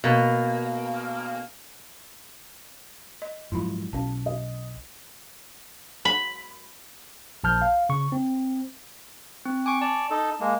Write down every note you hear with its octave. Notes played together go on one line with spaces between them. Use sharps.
B2 A#3
D#5
G#2 F3 F#3 E4 F4 B5
B1 C#4 A5
D#5
B5
A#1 A5 F6 G6
F5
C#3 C#6
C4
C4
G#5 C#6 D6
D5 A5
D#4 A4
G#3 A#3